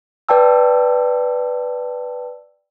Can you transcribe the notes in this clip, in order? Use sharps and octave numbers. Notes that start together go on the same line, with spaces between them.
B4 D5 G5 A5 E6